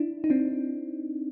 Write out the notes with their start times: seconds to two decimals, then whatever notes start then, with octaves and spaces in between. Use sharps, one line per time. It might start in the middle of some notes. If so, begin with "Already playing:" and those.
Already playing: D4 E4
0.24 D#4
0.30 C4 D4